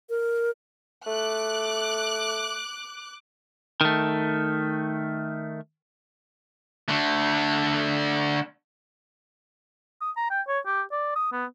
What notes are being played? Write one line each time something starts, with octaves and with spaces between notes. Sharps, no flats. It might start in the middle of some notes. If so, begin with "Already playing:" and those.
A#4
A3 D6 F#6
D#3 A3
D3 A3
D#6
A#5
G5
C#5
G4
D5
D#6
B3